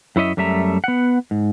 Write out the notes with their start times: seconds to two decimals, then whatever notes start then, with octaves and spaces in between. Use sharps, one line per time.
0.16 F#2 E4 C#5 D#5 E5
0.37 F#2 G3 A3 E5 A#5
0.84 B3 F#5
1.31 G#2